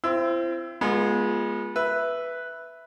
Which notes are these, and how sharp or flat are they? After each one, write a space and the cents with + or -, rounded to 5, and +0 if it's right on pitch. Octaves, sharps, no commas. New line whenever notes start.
C4 +0 E4 +45 E6 +0
G#3 +0 B3 -30 F4 +0
B4 +0 E5 +0